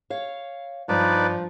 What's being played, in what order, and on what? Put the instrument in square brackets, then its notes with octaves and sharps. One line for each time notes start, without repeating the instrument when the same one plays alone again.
[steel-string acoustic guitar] C#5 F5
[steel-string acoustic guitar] G2 [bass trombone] F3 [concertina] D#4 B4 D5